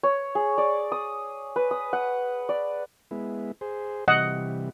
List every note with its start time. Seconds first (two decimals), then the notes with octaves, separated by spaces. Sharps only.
0.03 C#5
0.35 G#4
0.58 D5
0.92 D#6
1.56 B4
1.71 D#6
1.93 F#5
2.49 D5
3.11 G#3 B3 E4
3.61 G#4 C5
4.08 C3 E3 G3 D#5 F#5